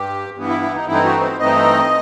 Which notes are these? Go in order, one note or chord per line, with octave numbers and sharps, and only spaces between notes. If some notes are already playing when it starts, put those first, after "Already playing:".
Already playing: G2 G4
G2 E3 B3
E4
E4
D#4
G2 E3 A3 C4 D#4 E4
F#4
C5
G2 E3 A3 C4 D#4 D#5